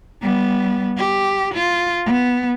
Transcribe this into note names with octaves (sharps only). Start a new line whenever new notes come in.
G3 B3
G4
F4
B3